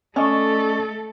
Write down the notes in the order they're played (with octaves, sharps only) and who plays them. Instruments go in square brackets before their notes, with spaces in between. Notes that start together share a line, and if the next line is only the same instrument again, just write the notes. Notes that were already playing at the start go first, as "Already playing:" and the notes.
[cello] A3 A4 [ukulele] C#4 [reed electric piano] D5 D#5 C#6